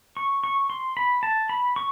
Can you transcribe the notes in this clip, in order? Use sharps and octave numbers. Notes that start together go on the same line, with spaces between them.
C#6
C#6
C6
B5
A5
B5
C#6